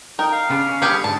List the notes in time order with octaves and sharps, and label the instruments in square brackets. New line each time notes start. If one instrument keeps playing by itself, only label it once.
[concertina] D#4 G5 [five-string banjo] A#4
[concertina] F5
[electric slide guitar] C#3 B3 D4
C#4
[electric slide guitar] D3 G3 B3 [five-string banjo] G4 G#4 B4
[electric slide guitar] G#2 D3 [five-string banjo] A5